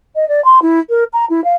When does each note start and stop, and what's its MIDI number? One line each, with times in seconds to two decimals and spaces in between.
0.15 0.28 75
0.28 0.43 74
0.45 0.62 84
0.62 0.80 64
0.90 1.04 70
1.13 1.25 82
1.30 1.43 64
1.44 1.56 77